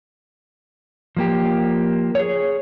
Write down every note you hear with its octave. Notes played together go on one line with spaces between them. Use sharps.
F3 A#3 G4
G#4 C#5